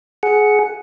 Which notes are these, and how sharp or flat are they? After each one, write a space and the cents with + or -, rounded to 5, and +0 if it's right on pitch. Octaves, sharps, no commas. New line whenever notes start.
G#4 +20 F#5 +0